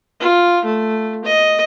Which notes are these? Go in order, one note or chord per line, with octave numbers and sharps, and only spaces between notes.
F4
A3
D#5